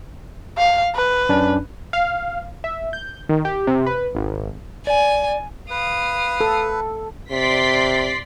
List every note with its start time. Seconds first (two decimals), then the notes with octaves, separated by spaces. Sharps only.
0.57 F5
0.95 B4
1.29 F#2 C#4 D4
1.93 F5
2.64 E5
2.93 G6
3.29 D#3
3.45 G4
3.67 C3
3.86 B4
4.15 G#1
4.87 D5 G#5
5.70 B4 F5 D#6
6.41 A4
7.31 C3 D5 C6 B6